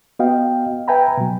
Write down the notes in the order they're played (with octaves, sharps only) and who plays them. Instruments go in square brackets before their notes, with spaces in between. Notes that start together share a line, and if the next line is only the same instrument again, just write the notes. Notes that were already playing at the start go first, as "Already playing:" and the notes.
[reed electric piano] B3 F#4 D#5 F5 G5
B4 E5 G5 G#5 A#5 B5
B2 F#3